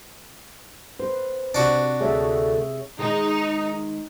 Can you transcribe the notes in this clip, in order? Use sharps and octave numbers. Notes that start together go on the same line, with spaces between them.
B4 C5
C3 D4 F#4
D2 A3 G#4 C#5 E5
D#3 G#3 D#4 G#4